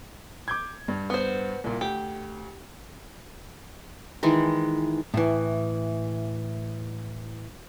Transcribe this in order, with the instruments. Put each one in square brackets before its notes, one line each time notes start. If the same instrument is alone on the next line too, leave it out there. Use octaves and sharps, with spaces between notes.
[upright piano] D6 G6 G#6
G2
[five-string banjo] B3 C5
[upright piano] C2 A#2
[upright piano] D2 [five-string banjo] G4
[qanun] D#3 E3 G#3
[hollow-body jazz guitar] A2 E3